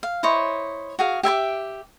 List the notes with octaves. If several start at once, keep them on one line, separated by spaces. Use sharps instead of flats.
F5
E4 C5 C#5 D#5
F#4 G#4 F5
G4 E5 G#5 D6